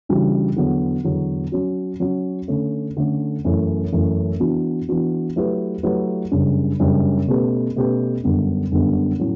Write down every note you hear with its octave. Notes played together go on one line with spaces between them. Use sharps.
C#3 E3 G3 D4 F#4
E2 D3 F#3 B3
E2 D3 F#3 B3
F#3 C#4 F#4
F#3 C#4 F#4
D3 A3 C#4
D3 A3 C#4
F#2 E3 A3 C#4
F#2 E3 A3 C#4
E3 B3 D4 F#4
E3 B3 D4 F#4
F#3 A3 E4 G4 B4
F#3 A3 E4 G4 B4
F#2 C#3 G3 D4
F#2 C#3 G3 D4
B2 A3 C#4 G4 B4
B2 A3 C#4 G4 B4
F#2 D3 G3 B3 D4
F#2 D3 G3 B3 D4
A2 F#3 C#4